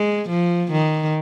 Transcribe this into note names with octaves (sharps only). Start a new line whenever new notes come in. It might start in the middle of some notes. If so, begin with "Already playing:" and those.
Already playing: G#3
F3
D#3